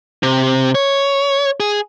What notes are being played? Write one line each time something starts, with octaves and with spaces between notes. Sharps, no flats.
C3
C#5
G#4